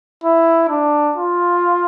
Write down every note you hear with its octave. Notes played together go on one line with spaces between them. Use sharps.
E4
D4
F4